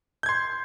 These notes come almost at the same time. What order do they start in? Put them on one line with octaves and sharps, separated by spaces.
G6 G#6 C6